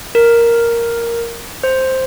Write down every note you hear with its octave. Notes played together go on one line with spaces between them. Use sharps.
A#4
C5